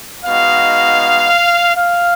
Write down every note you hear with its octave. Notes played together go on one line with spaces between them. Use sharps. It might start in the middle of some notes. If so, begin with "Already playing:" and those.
G#3 B3 D#4 F#4 F5
F5